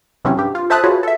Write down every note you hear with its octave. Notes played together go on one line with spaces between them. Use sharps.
C3 E3 F#3 C4 C#4
G2 G4
F4
A4 C5 E5 A5 D#6 F#6
F4 F#4 G#4 B4 C#5
A4 E5